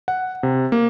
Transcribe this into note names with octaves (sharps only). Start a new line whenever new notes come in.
F#5
C3
A#3